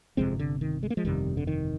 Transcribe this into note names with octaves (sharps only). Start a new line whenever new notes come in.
G1 F2 C3 G#3 C4
D3
D#3
G#3
A#3
F3 G#3
G1 F2 C3 D#3 G3
D3
D#3